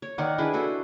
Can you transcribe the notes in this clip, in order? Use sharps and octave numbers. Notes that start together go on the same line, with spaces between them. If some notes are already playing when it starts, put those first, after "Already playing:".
C#5
D#3 D#4 D5 F#5
D4 E4 G#4 B4
F#4 A4 C5